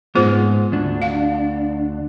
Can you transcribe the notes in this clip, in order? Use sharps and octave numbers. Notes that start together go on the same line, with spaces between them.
G#2 B3 F4 G#4 C5
D2 D4
F5